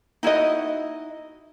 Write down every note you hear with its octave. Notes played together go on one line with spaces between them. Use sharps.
D#4 E4 F#4 D#5